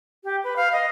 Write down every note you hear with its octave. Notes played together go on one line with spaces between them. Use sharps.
G4
B4
F5
D#5